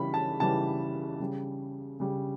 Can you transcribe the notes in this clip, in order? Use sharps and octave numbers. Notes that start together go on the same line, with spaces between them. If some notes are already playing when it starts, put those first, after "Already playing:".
Already playing: C#3 E3 G3 B5
A5
C#3 E3 G3 A5
C#3 G3
C#3 G3